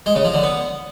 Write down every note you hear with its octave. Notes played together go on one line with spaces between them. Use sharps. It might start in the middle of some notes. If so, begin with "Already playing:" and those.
G#3
C#3
F3
D3
B3